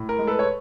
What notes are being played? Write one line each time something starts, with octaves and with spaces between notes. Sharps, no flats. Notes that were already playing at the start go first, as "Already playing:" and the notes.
Already playing: A2
A#4
G#3
A4 B4
C#5